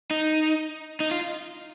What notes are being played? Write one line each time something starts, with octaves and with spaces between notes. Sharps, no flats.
D#4
D#4
F4